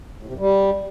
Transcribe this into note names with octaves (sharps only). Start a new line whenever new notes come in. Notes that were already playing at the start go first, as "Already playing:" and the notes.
A2
C3
F#2
G3